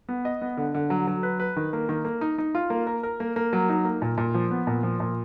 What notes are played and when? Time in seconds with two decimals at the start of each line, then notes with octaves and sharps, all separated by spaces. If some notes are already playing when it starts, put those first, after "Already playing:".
0.09 B3
0.25 D#5
0.42 B3
0.57 D3
0.74 D3
0.90 F#3
1.07 F#3
1.23 B4
1.40 B4
1.56 D#3
1.73 A#3
1.89 D#3
2.05 A#3
2.21 D#4
2.38 D#4
2.55 F4
2.70 A#3
2.87 A#4
3.03 A#4
3.20 A#3
3.36 A#3
3.53 F#3
3.69 D#4
3.85 A#3
4.02 A#2
4.18 A#2
4.34 F3
4.51 B3
4.67 A#2
4.83 F3
5.00 A#2